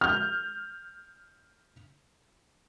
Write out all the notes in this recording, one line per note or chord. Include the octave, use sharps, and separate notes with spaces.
F6 G6